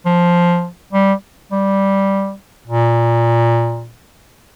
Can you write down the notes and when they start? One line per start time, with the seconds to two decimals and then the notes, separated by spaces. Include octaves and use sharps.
0.06 F3
0.93 G3
1.52 G3
2.68 A#2